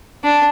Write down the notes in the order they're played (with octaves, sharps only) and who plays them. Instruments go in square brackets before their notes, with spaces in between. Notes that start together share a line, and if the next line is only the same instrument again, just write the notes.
[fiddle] D4